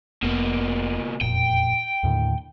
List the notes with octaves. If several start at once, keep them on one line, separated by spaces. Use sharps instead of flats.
F1 B2 A#3
E1 F2 A#2 G5
D#2 A2 D3